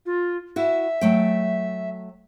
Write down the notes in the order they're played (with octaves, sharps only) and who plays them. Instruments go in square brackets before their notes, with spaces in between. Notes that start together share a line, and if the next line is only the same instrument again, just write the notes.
[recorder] F4
[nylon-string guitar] E4 F#4 [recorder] E5
[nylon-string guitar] F#3 A3 G5